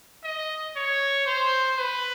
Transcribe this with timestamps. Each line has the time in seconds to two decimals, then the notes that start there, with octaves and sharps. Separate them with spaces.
0.24 D#5
0.76 C#5
1.26 C5
1.77 B4